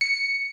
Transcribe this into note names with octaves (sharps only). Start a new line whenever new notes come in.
C#7